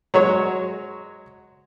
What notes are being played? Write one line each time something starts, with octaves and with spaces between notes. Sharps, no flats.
F#3 G#3 C#5